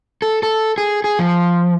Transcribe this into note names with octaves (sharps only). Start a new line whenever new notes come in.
A4
A4
G#4
G#4
F3